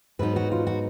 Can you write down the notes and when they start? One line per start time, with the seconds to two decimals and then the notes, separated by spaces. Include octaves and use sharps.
0.19 G#2 F#3 B3 D#4 B4
0.36 F#4
0.52 F4
0.67 F#4